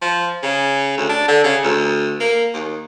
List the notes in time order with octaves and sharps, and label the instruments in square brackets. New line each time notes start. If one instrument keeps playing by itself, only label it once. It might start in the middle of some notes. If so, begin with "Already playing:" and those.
[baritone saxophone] F3
C#3
D2
D4
D3
C#3
D2
A#3
D#2